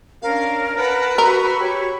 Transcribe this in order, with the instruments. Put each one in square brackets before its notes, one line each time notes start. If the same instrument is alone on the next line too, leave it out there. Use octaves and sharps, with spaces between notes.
[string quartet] C#4 D4 [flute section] A#4 [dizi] F5
[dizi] B4 [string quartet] F#5 A5 A#5
[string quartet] F#4 B5 C#6 [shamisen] A#4 [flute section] A#5 E6
[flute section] G4 C#5